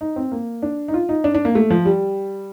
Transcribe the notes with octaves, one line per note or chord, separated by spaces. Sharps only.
D#4
C4
A#3
D4
D#4
F4
D#4
D4
D4
A#3
A3
F3
G3